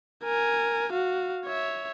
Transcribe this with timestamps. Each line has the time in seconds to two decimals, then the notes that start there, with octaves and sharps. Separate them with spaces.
0.24 A#4 G#5
0.93 F#4 F5
1.45 C#5 E5